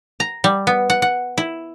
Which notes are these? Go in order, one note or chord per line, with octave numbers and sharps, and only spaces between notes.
A#5
G3
B3
F#5
F#5
E4